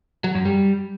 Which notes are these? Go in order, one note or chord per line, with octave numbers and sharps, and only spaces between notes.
F#3
F#2
G3